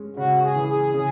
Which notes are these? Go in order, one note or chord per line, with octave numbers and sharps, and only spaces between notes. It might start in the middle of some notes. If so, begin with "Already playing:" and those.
Already playing: G#3 C#4
C#3 F#4
G#4
E3
G#4
C#3 G#4